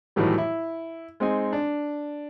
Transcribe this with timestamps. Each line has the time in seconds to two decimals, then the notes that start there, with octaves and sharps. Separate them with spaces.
0.16 A2 D#3 E3 F#3 G3
0.38 E4
1.20 G#3 C4 D#4 G#5
1.53 D4